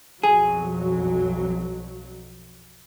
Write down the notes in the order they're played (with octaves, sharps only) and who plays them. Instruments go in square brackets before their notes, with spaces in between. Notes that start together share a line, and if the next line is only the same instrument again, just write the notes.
[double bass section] B1 F2 F#3 [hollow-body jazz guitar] G#4